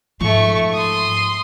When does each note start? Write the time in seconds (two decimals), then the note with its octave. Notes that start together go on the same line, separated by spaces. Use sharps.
0.20 G#2 F3 A3 C#6
0.73 C6 D#6